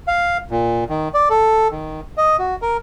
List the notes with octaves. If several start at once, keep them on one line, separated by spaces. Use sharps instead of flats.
F5
A#2
D#3
D5
A4
D#3
D#5
F#4
A#4